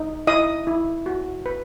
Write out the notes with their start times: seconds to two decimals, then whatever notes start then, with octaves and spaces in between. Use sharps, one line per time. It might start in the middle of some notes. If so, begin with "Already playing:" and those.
Already playing: D#4
0.27 E4 D#5 D#6
0.67 E4
1.06 F#4
1.46 B4